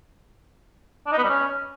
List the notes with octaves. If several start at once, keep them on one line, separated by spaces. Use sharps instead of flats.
D4
D#4
B3
G3
C#4